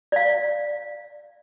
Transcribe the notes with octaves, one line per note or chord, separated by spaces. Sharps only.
D5 F5